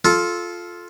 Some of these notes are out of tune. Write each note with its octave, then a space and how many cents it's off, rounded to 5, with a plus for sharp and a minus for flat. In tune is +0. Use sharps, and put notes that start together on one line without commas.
F4 +0 A4 -15